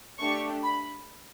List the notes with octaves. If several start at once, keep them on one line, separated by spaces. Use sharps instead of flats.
A3 D4 G4 C#6
B5